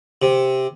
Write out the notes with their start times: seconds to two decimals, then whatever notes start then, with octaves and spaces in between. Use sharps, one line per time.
0.22 C3